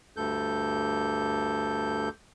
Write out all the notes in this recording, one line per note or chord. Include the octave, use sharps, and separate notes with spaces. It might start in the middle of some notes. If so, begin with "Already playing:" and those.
D2 G2 A4 G6